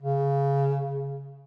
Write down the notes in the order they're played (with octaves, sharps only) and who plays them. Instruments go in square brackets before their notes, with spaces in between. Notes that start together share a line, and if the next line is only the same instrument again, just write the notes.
[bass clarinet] C#3